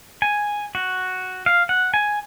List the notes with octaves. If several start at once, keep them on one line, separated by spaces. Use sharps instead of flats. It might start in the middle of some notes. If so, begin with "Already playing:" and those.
G#5
F#4
F5
F#5
G#5